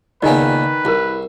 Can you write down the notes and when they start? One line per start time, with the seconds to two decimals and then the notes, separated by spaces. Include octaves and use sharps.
0.22 C#2 A#2 D#3 B3 B4 D5 D#5 G#5
0.85 C2 E4 G#4 A#4